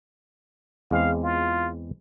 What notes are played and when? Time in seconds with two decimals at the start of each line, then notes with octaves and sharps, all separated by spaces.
0.91 E2 G#3 C4 F5
1.24 F4